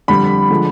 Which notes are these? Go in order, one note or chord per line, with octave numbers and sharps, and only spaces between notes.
F2 D3 G3 B5
D3 F3 G#3